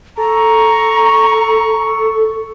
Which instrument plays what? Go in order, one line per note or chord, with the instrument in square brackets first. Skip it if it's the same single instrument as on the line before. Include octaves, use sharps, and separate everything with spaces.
[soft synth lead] A4 [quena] A#5 [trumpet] C#6